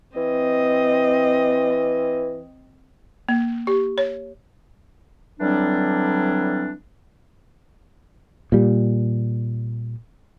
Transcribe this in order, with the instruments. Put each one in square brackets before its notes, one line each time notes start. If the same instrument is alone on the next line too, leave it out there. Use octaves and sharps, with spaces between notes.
[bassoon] E3 [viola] C4 D#5
[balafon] A#3
G4
C#5
[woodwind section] D3 E3 F#3 G3 C4 D4
[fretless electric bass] A#2 G3